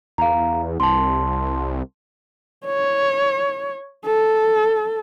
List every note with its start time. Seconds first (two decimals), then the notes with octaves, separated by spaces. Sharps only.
0.18 E2 F5 A#5
0.80 C2 A5 C6
2.66 C#5
4.06 A4